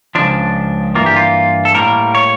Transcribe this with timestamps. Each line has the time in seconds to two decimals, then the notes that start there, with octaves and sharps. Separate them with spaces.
0.15 C#2 C#3 F3 D4
0.95 G2 E3 A#3 F4
1.06 G4
1.16 F4
1.65 A4
1.75 A2 G3 A#3 A#4
2.15 C#5